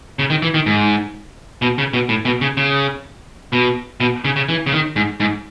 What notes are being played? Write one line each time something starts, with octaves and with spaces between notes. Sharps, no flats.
C#3
D#3
E3
D#3
G#2
B2
C#3
B2
A2
B2
C#3
C#3
B2
B2
C#3
C#3
E3
C#3
D#3
G#2
G#2